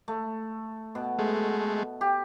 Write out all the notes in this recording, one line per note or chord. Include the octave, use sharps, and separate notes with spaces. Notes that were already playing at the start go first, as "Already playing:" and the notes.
A3
B2
G#3 A3
G4